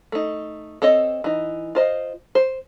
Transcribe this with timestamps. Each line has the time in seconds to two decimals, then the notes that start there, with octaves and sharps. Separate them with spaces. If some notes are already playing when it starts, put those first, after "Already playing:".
0.12 A3 D#4
0.82 C4 A4 C#5 D#5
1.24 E3 D#4
1.75 F4 C5 D#5
2.35 C5